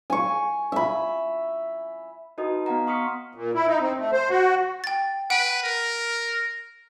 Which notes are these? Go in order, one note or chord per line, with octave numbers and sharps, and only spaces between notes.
G#5 C#6
E5 B5
D#4 F#4 B4 D#5 A#5 D#6
B3 F5 F#5 A#5
C6 C#6 D#6 F6 B6 C#7
A#2
E4
D#4
C4
A3
C5
F#4
G5 A6
B4 F#5 D7
A#4